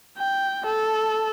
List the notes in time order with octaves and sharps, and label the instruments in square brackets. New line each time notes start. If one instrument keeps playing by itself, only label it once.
[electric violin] G5
A4